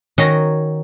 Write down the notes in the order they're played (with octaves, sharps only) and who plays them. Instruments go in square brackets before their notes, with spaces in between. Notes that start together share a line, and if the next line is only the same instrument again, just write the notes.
[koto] D#3 C#4 F#4 D#5 A#5